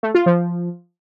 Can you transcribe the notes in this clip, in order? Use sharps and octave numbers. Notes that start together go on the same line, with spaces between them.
A3
F4
F3